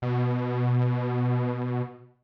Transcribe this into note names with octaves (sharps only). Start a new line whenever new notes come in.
B2